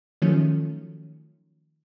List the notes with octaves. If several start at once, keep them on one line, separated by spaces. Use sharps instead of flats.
D#3 F3 F#3 A3 C#4